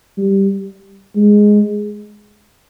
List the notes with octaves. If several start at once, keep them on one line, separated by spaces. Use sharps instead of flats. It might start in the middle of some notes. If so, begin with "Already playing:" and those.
G3
G#3